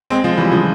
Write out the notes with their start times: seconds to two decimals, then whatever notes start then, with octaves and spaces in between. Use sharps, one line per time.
0.10 G#3 C4
0.24 F3 G#3
0.38 E3 G3
0.51 C#3 F3